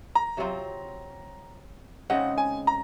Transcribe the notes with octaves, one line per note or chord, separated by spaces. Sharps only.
A#5
C3 F#3 C4 F4
C#3 G#3 C4 D#4 F#5
G#5
A#5